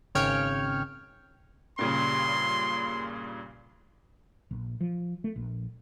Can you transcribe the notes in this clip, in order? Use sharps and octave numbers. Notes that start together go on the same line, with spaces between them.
G#1 C#3 C#5 G5 F6
G2 A#2 C#3 C6
A#1
F3
A3
A#1